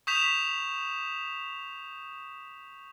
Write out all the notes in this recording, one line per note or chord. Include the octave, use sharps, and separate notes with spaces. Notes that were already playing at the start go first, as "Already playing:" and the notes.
C#6 D#6 G6 B6 E7 F7